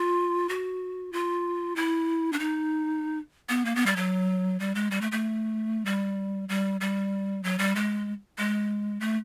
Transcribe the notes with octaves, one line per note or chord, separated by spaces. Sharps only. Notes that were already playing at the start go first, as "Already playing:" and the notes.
Already playing: F4
F#4
F4
E4
D4
D#4
B3
A#3
B3
G3
F#3
G3
G#3
G3
A3
A3
G3
G3
G3
F#3
G3
G#3
G#3
A3